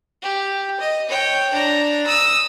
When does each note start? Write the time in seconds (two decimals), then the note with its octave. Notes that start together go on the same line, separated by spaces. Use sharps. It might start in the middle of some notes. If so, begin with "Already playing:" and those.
0.22 G4
0.80 D#5
1.09 C#5 G5
1.53 D4 A#5
2.06 D#6 E6